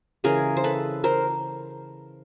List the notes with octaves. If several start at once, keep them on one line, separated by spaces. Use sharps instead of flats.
C#3 E3 G#3 G#4 A#4
C5
A4 B4
A#4 C5